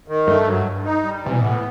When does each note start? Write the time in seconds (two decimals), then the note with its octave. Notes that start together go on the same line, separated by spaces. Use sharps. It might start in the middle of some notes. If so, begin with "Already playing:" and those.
0.08 D#3
0.27 G2 A3
0.46 F#3
0.66 G2
0.84 D#4
1.03 G3
1.23 C3 E3
1.34 B2
1.41 A2 B3